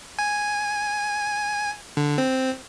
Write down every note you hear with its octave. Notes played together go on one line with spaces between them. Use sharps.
G#5
D3
C4